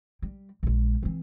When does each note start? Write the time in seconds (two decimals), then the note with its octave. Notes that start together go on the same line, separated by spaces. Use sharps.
0.22 G3
0.63 A#1 G#3
1.02 E3 C4